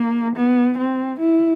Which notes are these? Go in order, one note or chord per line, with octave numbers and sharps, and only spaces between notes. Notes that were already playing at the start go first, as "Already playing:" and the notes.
Already playing: A#3
B3
C4
E4